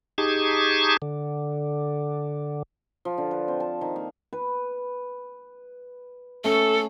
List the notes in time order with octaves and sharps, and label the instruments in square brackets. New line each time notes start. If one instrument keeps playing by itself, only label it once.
[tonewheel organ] D#4 G4 G#4 A5 C#6 G#6
D3
[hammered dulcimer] F3
D3
B4
C4
A5
D#3
A#3
B4
[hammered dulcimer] A3 C#4 [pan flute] A4